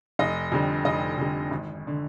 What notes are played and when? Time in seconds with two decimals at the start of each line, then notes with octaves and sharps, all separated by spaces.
0.19 F1 D#5
0.52 F2 D3 G3
0.85 F1 D#5
1.18 F2 D3 G3
1.51 G#1
1.87 D3